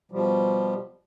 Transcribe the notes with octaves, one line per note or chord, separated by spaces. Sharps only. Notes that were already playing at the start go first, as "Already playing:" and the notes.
B2 F3 G3